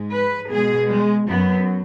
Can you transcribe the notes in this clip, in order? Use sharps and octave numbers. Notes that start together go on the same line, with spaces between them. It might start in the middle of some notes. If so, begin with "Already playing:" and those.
Already playing: G#2 G#3
B4
B2 G#3 G#4
G#3
F#2 F#3 B3